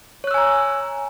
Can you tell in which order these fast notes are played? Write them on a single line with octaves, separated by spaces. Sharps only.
C#5 F#6 E6 G#5 A#5